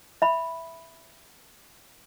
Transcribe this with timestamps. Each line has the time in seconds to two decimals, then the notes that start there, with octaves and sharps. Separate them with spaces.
0.22 E5 B5